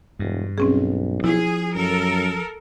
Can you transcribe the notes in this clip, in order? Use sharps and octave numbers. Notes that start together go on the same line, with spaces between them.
E1 G2
B1 C4 C#4 G#4
F3 E4 G#4
F#2 A4 A#4